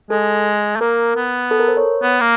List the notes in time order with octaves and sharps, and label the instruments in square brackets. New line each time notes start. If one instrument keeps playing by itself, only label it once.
[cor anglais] G#3 [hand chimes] A4
[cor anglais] A3
[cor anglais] A#3 [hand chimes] A#4
[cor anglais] B3
[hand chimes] A4
A#4
C5
C#5
[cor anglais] B3
A#3